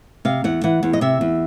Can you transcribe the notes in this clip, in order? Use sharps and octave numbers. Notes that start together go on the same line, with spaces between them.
C3 F5
E2 F#5
E3 F#5
E2
D#5
C3 E5
E2